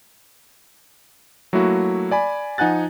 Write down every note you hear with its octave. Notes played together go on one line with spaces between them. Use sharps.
F#3 A3 A#3 E4 F#4
D5 G#5 B5
F3 D#4 F#5 G#5 F#6 A6